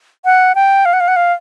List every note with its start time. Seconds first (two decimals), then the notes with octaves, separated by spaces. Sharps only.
0.25 F#5
0.55 G5
0.85 F5
0.93 F#5
1.00 F5
1.08 F#5
1.16 F5